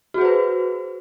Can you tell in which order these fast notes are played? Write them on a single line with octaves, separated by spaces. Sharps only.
F#4 G#4 C5 B4